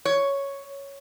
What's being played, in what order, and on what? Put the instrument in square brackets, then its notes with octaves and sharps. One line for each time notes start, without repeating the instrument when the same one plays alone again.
[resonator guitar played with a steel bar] C#5